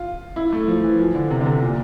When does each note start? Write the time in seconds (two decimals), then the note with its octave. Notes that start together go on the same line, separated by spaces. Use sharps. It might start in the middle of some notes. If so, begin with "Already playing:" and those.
Already playing: F4
0.36 E4
0.52 A3
0.68 F3
0.83 E3
0.99 F3
1.15 D3
1.30 C3
1.41 D3
1.46 C3
1.61 A#2